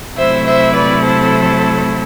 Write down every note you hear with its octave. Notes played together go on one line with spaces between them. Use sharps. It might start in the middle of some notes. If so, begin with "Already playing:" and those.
C3 F#3 A3 E4 C5 E5
C5 E5
B4 D5
A4 C5